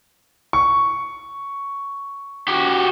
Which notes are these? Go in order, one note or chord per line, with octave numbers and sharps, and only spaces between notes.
C#6
F#4 G4